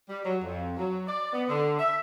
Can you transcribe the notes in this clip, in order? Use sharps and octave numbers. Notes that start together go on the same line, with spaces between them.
G3
F#3
F2
F#3
D5
B3
D3
E5